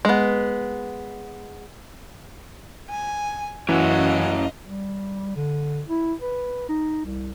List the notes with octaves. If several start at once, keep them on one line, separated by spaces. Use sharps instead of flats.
G#3 B3
G#5
F#2 E3 C#4 E4 F#4 D#5 F5
G3
D3
E4
B4
D#4
C2